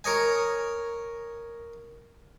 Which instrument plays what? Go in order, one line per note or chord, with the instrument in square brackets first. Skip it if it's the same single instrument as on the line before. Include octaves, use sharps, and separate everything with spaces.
[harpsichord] A#4 C#5 D#5 G#5